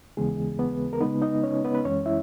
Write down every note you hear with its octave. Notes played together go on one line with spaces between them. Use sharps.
D#2 C#3 E3 G#3 B3 G#4
B3 B4
A#4
C#3 G#3 B3 D#4 B4
D#4 D#5
C#4 C#5
B3 B4
B4
F#2 E3 G#3 C#4 C#5
E4 E5